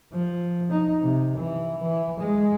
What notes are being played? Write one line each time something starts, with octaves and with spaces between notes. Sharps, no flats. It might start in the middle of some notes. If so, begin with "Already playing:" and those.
F3
D#4
C3
E3
E3
G#3